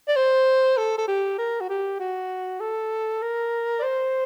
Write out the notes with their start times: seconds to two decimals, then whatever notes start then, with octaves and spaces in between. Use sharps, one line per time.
0.08 D5
0.16 C5
0.77 A4
0.98 A4
1.08 G4
1.39 A#4
1.60 F#4
1.69 G4
1.99 F#4
2.60 A4
3.22 A#4
3.79 D5
3.83 C5